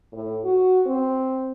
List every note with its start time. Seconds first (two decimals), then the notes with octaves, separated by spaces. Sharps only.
0.12 A2
0.44 F#4
0.86 C4